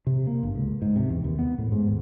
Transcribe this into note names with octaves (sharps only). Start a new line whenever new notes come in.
C3
A#3
G1
C#2
G#2
C3
E2
D#2
B3
A2
G#2
D#2